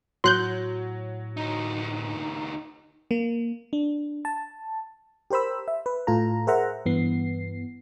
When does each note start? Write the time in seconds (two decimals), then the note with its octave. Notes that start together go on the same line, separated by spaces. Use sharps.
0.24 A2 F#3 C6 F#6 G6
1.37 D2 D#4
3.11 A#3
3.73 D4
4.25 A5
5.30 G4 A#4 C5 B5 E6
5.68 E5
5.86 B4
6.07 A2 F4 A4 A#5
6.47 G#4 A#4 C5 E5 F#5 A#5
6.86 G2 E3 B3 C7